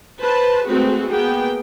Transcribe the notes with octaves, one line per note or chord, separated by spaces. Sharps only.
B4 C5 A5
G#3 A3 C4 F#4 G#4 B4
A#3 B3 G#4 G5